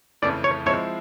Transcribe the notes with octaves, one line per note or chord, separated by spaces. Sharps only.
F2 C#3 E3 A3 C#4 D5
C#5
F3 G#3 C4 E4 C#5